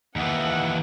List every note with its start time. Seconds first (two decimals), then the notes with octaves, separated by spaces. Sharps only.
0.16 D#2 E3 F#5